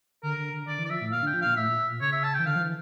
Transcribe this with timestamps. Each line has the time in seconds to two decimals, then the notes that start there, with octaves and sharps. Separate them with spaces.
0.23 D3 A#4
0.37 D3
0.53 D3
0.67 D3 D5
0.78 E3
0.85 D5
0.90 F3 E5
1.01 A2
1.12 A#2 F5
1.23 D3 G5
1.34 F3
1.42 A#2 F5
1.56 A2 E5
1.67 A#2
1.89 A#2
2.01 C#3 C#5
2.12 E5
2.24 A5
2.34 G5
2.39 E3
2.46 D3 F5
2.56 F3
2.60 E3